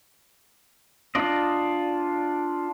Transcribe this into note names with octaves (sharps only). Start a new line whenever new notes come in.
D4 F4 D5 D#5